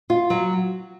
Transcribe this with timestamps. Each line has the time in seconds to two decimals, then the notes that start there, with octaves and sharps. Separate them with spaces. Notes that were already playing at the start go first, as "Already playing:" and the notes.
0.10 F4
0.30 F#3